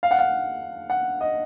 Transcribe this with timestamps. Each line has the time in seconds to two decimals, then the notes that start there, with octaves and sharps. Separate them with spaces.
0.03 F5
0.11 F#5
0.19 F5
0.90 F#5
1.21 D#5